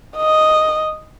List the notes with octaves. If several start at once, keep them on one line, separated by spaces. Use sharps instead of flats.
D#5